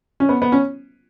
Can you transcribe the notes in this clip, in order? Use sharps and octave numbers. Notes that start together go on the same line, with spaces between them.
C#4
B3
B3
C#4